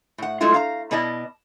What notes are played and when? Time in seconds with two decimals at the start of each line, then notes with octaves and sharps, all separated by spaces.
0.18 A2 F#5
0.40 F#3 G#3 A3 D4 E4 F4
0.54 F5 A#5
0.91 B2 B3 E4 D5 D#5 A5